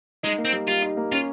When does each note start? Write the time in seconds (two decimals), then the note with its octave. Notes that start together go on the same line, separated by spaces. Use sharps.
0.23 G#3 D#4
0.38 A#3
0.45 C4
0.53 G3
0.67 G3 F4
0.82 D#4
0.97 A#3
1.12 C#4 F4